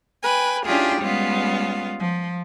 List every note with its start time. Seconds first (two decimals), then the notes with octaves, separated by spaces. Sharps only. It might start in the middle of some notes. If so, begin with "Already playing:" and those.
0.22 B4 G5 G#5
0.66 C#4 D4 E4 F4 G4 G#4
1.01 G3 G#3 B3 C#4 F4
1.99 F3